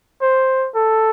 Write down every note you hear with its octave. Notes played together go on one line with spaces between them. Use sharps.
C5
A4